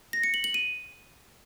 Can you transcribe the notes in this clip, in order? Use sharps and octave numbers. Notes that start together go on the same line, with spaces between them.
A#6
C#7
F#7
F#7
D#7